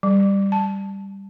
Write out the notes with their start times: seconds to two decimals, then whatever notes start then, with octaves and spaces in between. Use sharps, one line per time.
0.03 G3
0.52 A5